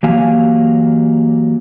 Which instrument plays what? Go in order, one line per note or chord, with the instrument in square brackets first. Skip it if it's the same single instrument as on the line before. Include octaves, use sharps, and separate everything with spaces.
[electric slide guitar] E3 F#3 A#3 G4 F5 G#5